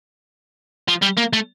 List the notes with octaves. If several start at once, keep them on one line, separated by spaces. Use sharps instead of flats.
F3
G3
A#3
A3